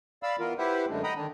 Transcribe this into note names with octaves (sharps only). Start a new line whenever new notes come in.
D5 F5 B5 E6
E3 B3 F4 A#4
E4 G4 B4 C5 E5 F#5
F#2 D3 G#3 A3 D4
D#5 F#5 G5 A#5 B5 D#6
D3 D#3 D4